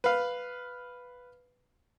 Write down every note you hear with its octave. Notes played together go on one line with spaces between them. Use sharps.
B4 F5